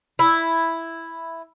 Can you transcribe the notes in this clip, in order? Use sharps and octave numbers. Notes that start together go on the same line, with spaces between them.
E4